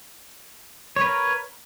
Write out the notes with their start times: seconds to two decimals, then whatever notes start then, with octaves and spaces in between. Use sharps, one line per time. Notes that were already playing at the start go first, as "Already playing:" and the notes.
0.96 C#5
1.01 B4
1.06 A#4